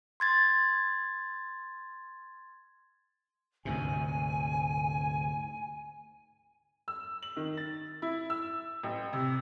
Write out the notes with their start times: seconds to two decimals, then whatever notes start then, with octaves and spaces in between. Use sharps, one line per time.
0.20 C6 G#6 A6
3.65 D2 G#2 C3 G#5
6.88 E6
7.23 F#7
7.36 D#3
7.57 A6
8.02 E4
8.30 E6
8.84 A1
9.13 C3